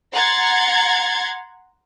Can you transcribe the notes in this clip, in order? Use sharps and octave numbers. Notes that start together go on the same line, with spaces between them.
F#5 A#5 C6 G#6 A6